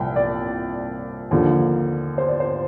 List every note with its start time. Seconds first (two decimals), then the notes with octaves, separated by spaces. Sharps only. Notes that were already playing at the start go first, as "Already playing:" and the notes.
Already playing: C2 A#2 F3 G5
0.16 D5
1.31 D#2 D3 F3
2.18 C5
2.28 D5
2.40 C5